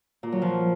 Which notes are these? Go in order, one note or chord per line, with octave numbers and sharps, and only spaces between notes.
A#2
F#3
F3